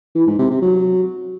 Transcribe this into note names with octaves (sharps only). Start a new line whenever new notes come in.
E3
G#2
C3
C3
F#3